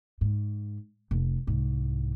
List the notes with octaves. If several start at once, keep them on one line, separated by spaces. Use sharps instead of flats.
G#2
F1
C2 G#2